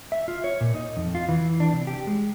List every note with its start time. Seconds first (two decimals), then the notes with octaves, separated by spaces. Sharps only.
0.12 E5
0.28 F4
0.44 C#5
0.61 A#2
0.75 D#4
0.97 F2
1.15 F4
1.29 E3
1.60 D4
1.72 C3
1.87 G4
2.07 G#3